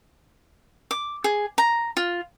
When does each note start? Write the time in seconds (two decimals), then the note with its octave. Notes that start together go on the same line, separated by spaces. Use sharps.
0.91 D6
1.24 G#4
1.58 A#5
1.97 F4